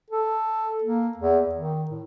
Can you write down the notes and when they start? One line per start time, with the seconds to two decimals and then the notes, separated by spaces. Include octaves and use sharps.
0.11 A4
0.84 A#3
1.17 E2
1.55 D#3
1.91 A2